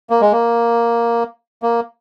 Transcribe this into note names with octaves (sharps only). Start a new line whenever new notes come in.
A#3
G#3
A#3
A#3